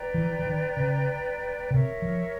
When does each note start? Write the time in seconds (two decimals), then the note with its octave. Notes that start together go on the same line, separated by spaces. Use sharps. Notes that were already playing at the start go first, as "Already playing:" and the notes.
Already playing: B4 D5 G5 A#5
0.14 E3
0.39 E3
0.46 D#3
0.77 C#3
1.71 C3 A#4 C#5 E5
2.02 F3